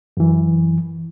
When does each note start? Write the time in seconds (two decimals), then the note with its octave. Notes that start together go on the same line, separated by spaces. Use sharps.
0.17 F#2 E3